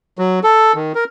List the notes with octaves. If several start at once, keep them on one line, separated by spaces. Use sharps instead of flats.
F#3
A4
D#3
A#4